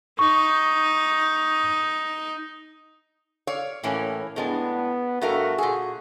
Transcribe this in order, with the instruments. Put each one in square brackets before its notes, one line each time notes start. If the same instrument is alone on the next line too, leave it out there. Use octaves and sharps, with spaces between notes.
[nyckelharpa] D#4 [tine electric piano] C#6
[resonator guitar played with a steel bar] C#5 D5 F5
[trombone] A2 [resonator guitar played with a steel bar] E3 A#3 C#4
[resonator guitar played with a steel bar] A2 G#3 D4 [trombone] B3
[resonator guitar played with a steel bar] G2 A3 A#4 [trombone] F#4
[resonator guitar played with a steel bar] A#2 G#4